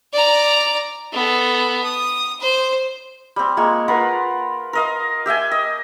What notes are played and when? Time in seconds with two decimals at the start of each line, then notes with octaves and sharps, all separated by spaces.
0.13 D5 A#5
1.12 B3 A4
1.84 D#6
2.40 C5
3.36 G3 C4
3.57 G#3 A#3 F4 C#6
3.88 F4 A#4 B4 F#5
4.73 A#4 D#5 F5
5.26 G4 E5 G5 G#5
5.51 D#5